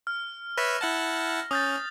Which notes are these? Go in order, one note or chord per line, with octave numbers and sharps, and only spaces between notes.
F6
B4 C#5 E5 A#6
E4 F#5 A5
C#4 D#6 G6 A6